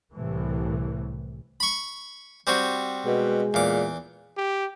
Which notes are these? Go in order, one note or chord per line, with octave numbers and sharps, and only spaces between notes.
C2 A2 C3 E3
B5 C#6
G3 C4 F#4
B2 G#3
E2 A#2 D6
G4